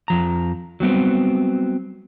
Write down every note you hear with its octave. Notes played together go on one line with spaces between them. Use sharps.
F2 F3 A#5
F#3 G3 B3 C4